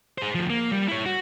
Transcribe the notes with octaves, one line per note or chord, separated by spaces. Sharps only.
G#4 C5
D2 F3
A#3
G3
E4 C#5
F#4